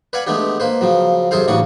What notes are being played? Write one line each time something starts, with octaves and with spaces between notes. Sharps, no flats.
B4 D5 F5 F#5 G#5
G#3 A3 B3 D4 G4
A#3 B4 C5
C#3 F3 F#3
F#2 C3 G#4 A4 C5 F5
A1 C#3 D4 F#4 C#6 D#6